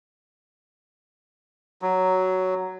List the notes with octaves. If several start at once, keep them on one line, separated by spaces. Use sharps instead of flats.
F#3